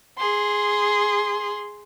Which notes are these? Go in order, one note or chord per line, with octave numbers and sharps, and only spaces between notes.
G#4 C6